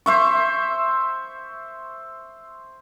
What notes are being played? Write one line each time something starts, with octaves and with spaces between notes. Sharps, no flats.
C5 E5 C#6